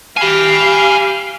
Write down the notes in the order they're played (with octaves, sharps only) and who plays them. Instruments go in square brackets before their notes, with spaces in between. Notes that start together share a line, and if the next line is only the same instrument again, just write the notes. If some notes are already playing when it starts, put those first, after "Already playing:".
[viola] G4 F5 [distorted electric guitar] G#5 B5